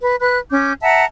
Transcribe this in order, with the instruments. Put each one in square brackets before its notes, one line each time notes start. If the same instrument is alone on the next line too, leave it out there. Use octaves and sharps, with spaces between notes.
[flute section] B4
B4 F#6
C#4 D6 G6
E5 F#5 A5 A#5